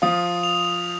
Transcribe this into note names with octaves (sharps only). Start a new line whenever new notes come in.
F3 F4 D#6
F7